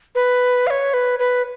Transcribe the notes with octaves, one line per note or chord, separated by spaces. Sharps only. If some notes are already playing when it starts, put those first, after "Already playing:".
B4
F5
C#5
B4
B4